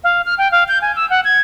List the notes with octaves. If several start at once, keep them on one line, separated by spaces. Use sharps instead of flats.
F5
F6
G5
F5
G6
G#5
E6
F#5
G#6